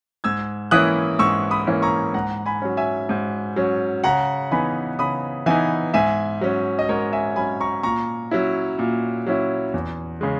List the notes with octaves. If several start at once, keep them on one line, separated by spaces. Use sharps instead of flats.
G#2 E6 G#6
E3 A#3 C#4 E4 D#6 F#6
G#2 C#6 E6
B5 D#6
E3 A#3 C#4 E4
A#5 C#6
G#2 F#5 A#5
G#5 B5
F#3 C#4
E5 G#5
G#2
F#3 C#4
C#3 F#5 A#5
E3 B3 D#4 G#5 B5
C#3 B5 D#6
E3 B3 D#4 E5 G#5
G#2 E5 G#5
F#3 C#4
D#5
G#2 A#4 C#5
E5 G#5
F#3 C#4 G#5 B5
A#5 C#6
A#2 A#5 C#6
F#3 C#4 E4
A#2
F#3 C#4 E4
E2
C#3 G#3